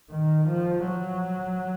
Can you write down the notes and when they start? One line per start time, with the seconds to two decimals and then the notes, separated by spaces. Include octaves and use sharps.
0.11 D#3
0.49 F3
0.87 F#3